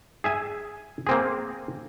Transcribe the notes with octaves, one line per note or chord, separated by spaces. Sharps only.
G#4 E5 G#5
A#3 C4 G#4